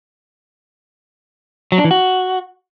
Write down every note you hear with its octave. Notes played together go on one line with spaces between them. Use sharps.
F#3
D4
E3
F#4